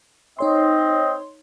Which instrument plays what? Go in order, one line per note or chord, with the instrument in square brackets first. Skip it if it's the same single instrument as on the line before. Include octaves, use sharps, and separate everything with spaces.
[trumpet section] C4 D#5 [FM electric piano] D#4 C#5 C6